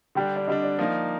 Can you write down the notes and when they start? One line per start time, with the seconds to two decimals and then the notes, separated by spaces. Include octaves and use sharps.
0.15 D3 G3 D4 G5
0.36 D5
0.48 D3 G3 D4 D#5
0.63 D5
0.79 F3 A#3 D#4